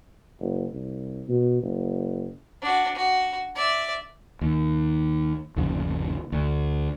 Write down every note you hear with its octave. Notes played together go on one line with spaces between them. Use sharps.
F#1
C2
B2
F#1
D4 F#4
F#4
D5 E5
D#2
G1 D#2 C#3 F3
D2